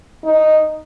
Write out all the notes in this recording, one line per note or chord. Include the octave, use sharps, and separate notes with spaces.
D#4